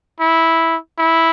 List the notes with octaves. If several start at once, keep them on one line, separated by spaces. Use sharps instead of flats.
E4
E4